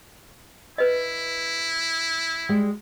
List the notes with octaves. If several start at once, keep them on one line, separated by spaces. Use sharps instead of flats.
E4 B4 D#5
G3 G#3